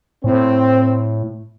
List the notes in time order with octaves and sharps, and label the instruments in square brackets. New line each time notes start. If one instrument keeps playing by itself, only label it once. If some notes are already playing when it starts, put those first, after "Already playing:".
[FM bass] A2 [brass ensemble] C4